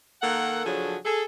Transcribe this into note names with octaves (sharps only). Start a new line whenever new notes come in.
D#3 A#3 A4 F#5
C#3 F3 F#3 D4 G#4 A4
G#4 A4